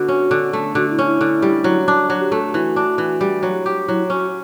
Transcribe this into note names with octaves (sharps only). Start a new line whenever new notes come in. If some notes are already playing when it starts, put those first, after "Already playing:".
Already playing: D3 B3 F#4
C#4
D3
A3
D3 F#4
E4
C#4
E4
D3
G3
F#3
D4
F#3 F#4
G4
A3 A4
F#4
E3 F#4
D4
E3
G3
F#3
G4
F#3 E4
C#4 F#4